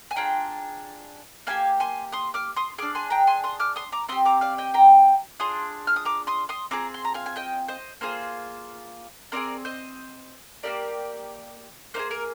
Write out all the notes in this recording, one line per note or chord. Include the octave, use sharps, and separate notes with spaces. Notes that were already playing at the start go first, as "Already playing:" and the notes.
G#5
D4 F4 G#4 G5 A#5
A#3 D#4 G4 F5 G#5
G#5 C6
C6 D#6
D6 F6
C6 D#6
D4 G#4 D6 F6
G#5 C6
G5 A#5
G#5 C6
C6 D#6
D6 F6
C6 D#6
A#5 D6
C4 G4 C6 D#6
A#5 D6
D5 F5
D#5 G5
G5 A#5
D4 F4 G#4 C6 D#6
F6
D#6
A#5 D6
C6 D#6
C6 D#6
C4 F4 G#4 A#5 D6
C6
A#5
F5 G#5
G#5
D#5 G5
C5 D#5
A#3 F4 G#4 C5
C4 F4 G#4 A#4 D5
C5 D#5
A#3 D#4 G4 A#4 D5
A#3 D#4 G#4 C5
A#4